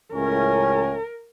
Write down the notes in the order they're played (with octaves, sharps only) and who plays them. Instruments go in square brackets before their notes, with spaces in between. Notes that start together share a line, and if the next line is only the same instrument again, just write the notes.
[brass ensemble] C#2 A2 C#4 [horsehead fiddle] A#4